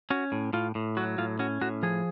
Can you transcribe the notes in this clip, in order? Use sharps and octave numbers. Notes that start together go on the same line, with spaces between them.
C#4 F#4
A2
A2 F4
A2
F#3 F#4
A2 F4
C#4 F#4
A2 F#4
F3 G#4